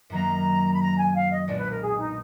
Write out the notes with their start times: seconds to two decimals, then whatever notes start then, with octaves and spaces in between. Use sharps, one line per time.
0.10 F#2 D#3 F#3 A#3 A#5
0.72 B5
0.80 A#5
0.97 G#5
1.15 F5
1.31 D#5
1.48 B1 A#2 G#3 D4 F#4 D5
1.59 B4
1.70 A#4
1.81 G#4
1.98 D#4